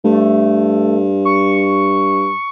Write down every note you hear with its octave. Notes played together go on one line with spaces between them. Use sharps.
G2 A3
C#6